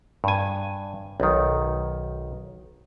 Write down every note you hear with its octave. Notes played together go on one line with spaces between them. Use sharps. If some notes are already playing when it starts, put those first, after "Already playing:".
G2 G#5
B1 D#3